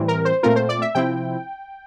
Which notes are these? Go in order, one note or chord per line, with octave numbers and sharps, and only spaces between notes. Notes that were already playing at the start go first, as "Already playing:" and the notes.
Already playing: A2 E3 G3 C4
A#4
C5
A#2 A3 C4 F4 A#4
C5
D5
E5
C3 F3 C4 E4 G5